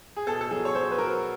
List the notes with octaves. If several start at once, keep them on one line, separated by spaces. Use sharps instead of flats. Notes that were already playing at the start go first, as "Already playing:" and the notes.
G#4
B2 A4
A4
F#3 G#4
C#5
F#3 C5
B4
F#3 A#4